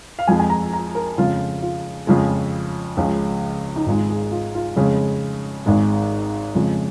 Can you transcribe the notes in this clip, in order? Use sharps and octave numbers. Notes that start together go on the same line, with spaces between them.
F5
F2 F3 G#3 G#5
G#5
A#5
A#5
A#4
F2 C#3 G#3 F4
F4
F2 C#3 F3 G#3
C#2 C#3 F3 G#3
D#4
G#1 G#2 G#3 F4
G#4
F4
F4
F2 C#3 G#3 G#4
G#1 G#2 G#3
F2 C#3 F3 G#3